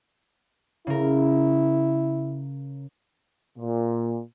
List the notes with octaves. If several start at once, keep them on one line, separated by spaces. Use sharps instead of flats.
C#3 E4 A#4
A#2